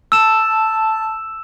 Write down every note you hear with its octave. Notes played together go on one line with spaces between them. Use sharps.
A5 E6 E7